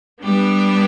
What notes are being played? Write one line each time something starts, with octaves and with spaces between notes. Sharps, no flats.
G3 B3 D4 G4 B4